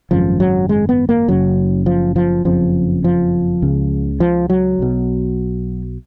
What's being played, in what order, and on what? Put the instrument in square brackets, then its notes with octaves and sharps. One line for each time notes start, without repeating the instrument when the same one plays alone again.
[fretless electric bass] G#1 F#2 C#3 F3
F#3
G#3
B3
A#3
F#1 F#2 C#3 F#3
F3
F3
F#1 F2 C#3 F3
F3
C#2 C#3
F3
F#3
B1 B2